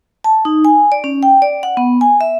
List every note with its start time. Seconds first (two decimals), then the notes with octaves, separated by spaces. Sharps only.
0.24 A5
0.45 D#4
0.65 G#5
0.92 D5
1.04 C#4
1.23 G5
1.42 D5
1.63 F#5
1.77 B3
2.01 G#5
2.21 E5